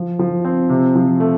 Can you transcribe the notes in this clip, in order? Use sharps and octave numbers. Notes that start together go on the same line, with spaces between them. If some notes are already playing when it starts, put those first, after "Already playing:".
Already playing: F3
F3
C4
C3
F3
A3